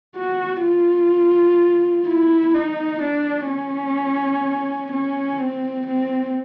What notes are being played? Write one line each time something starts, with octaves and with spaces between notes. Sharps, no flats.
F#4
F4
E4
D#4
D4
C#4
C#4
C4
C4